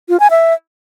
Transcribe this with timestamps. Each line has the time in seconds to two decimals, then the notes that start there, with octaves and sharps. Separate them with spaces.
0.09 F4
0.20 G#5
0.31 E5